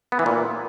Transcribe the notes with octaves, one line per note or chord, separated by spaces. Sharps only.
B3
E3
A#2